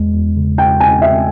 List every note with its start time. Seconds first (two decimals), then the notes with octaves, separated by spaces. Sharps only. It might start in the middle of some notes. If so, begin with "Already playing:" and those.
Already playing: E2 G#3
0.14 E2
0.37 C#3
0.58 E2 G5
0.80 E2 G#5
1.02 E2 E5